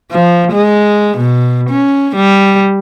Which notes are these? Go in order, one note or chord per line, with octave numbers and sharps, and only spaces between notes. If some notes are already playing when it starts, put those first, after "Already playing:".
F3
G#3
B2
C#4
G3